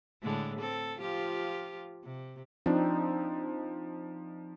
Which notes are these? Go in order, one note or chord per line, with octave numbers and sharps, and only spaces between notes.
A2 D3 G#3
C4 A4
F3 F4 G4
C3
F3 C4 D4 D#4